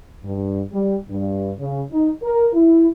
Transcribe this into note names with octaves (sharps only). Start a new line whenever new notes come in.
G2
G3
G2
C#3
D#4
A#4
E4